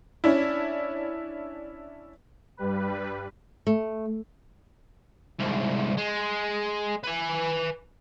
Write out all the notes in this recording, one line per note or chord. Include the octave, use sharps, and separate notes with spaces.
C#4 D4 E4
G2 G3 B4
A3
C2 G#2
G#3
B4 G#5